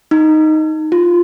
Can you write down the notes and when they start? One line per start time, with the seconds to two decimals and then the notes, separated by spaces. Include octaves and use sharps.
0.11 D#4
0.92 F4